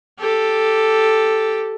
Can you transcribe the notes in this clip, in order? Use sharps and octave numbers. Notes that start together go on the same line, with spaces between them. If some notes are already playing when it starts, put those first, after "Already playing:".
G4 A4